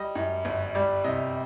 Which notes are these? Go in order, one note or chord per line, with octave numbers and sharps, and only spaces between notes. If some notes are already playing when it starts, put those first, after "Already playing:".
Already playing: G3 D#5
F#2
G1
G3 D5
C3 D#5